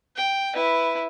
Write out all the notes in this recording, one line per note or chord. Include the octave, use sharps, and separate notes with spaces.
G5
E4 B4